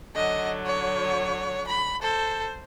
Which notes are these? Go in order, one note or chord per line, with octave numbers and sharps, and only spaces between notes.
D3 F#3 D#5
C#5
B5
A4 C5